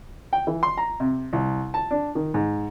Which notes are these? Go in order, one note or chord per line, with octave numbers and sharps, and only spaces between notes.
G5
E3
C6
A#5
C3
C2
A5
D4
D#3
G#2